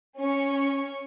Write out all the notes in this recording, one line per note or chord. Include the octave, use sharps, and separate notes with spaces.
C#4 C#6